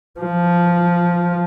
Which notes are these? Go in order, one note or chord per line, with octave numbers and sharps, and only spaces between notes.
F3